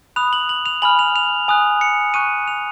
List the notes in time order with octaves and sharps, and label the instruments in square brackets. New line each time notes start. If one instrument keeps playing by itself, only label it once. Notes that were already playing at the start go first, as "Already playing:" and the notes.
[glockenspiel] B5 D#6 F#6 F7
F#7
F#7
F7
G#5 B5 F6 F#7
F7
F7
G#5 D#6 F#6
C#7
G#5 C#6 F#6 D#7
F7